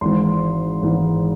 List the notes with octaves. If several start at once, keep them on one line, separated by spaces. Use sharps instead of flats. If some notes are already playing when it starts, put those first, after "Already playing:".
G#1 G#2 E3 C6
G#1 G#2 E3